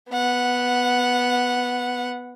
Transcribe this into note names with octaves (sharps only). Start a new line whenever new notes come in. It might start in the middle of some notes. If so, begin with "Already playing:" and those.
B3 F#5